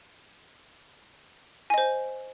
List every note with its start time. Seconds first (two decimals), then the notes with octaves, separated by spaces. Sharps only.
1.70 G#5
1.74 D#5
1.78 C5